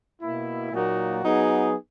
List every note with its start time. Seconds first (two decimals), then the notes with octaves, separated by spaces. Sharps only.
0.21 B2 A#3 E4
0.72 A#2 F#3 A#3 D#4 F#4
1.24 F#3 B3 D#4 G#4